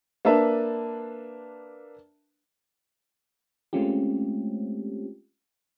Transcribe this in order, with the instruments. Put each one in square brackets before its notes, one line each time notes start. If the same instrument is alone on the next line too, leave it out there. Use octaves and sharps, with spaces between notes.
[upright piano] A#3 D4 B4 E5 A5
[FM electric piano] G#3 A3 C4 C#4 F4 G4